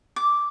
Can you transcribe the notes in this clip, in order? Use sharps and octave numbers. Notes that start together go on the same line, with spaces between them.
D6